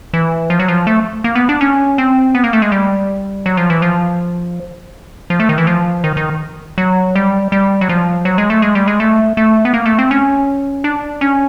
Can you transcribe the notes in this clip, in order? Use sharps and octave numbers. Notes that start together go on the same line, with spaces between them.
E3
F3
F#3
F3
A3
A#3
B3
D4
C#4
C4
B3
A#3
A3
G#3
G3
F#3
F3
E3
F3
F3
A3
D#3
E3
F3
D#3
D#3
F#3
G3
G3
F#3
F3
F#3
G#3
A3
G#3
G3
G#3
A3
A3
B3
A#3
A3
C4
C#4
D4
C#4